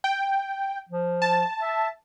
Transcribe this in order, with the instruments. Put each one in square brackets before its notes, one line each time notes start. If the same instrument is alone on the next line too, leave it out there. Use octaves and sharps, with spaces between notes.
[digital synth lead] G5
[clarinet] F3
[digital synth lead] A5
[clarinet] E5